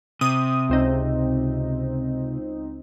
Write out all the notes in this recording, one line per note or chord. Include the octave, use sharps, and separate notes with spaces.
C3 D#6
C#2 C4 D#4